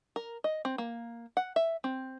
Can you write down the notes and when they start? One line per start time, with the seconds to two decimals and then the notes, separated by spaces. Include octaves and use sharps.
0.16 A#4
0.44 D#5
0.65 C4
0.78 A#3
1.37 F#5
1.56 E5
1.84 C4